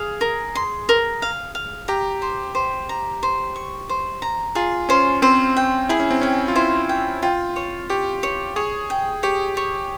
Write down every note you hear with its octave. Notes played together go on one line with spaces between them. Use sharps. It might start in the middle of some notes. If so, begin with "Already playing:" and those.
Already playing: G#4 F5
A#4
C6
A#4
F5
F5
G4 A#5
C5
C5
A#5
C5
C#6
C5
A#5
F4 G#4
C#4 C5
C4 C5
G5
E4 G#4
C#4
C4
C#4 G5
F4
E4 C5
G5
F4 G5
C#5
G4 C#5
C#5
G#4 C#5
G5
G4 C#5
C#5